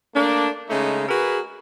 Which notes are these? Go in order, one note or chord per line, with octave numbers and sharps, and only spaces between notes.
A3 A#3 D4
C#3 G#3 A3 C#4 D#4
F#4 G#4 A#4 B4